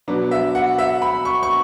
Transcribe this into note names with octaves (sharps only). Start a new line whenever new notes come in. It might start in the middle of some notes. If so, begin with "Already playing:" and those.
B2 F#3 B3 D4
E5
F#5
E5
B5
C#6
C#6